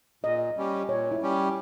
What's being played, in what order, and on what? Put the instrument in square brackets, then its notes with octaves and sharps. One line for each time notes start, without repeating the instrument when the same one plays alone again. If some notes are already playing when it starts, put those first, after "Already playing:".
[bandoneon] A#2 [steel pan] D#5
[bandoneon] G3 C#4 G4
[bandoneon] A#2 [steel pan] C#5
[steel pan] E4
[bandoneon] G3 C#4 G4